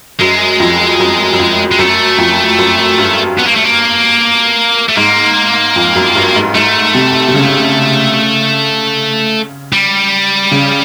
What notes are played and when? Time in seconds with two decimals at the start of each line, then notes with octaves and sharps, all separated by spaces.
0.20 F#2 G#3
0.60 F2
1.00 F#2
1.33 F#2
1.40 F2
1.71 G#3
1.79 F#2 A3
2.18 F2
2.58 F#2
2.98 G2
3.38 B3
3.47 A#3
3.55 A3
3.64 A#3
4.89 A3
4.96 G#2 A#3
5.76 F2
5.95 F#2
6.16 G2
6.35 G#2
6.55 G#2 A3
6.95 C3
7.28 C3
7.34 C#3
9.73 G3
10.52 C#3